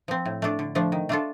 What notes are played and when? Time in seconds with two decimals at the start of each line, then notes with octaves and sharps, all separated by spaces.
0.08 F3 C4
0.25 A2
0.42 A3 D4 A4
0.59 D3
0.75 F3 A3 D4
0.92 D#3
1.09 A3 D4 F4 A4